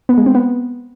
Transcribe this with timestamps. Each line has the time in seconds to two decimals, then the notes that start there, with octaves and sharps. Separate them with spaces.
0.09 B3
0.18 G#3
0.26 C4
0.35 B3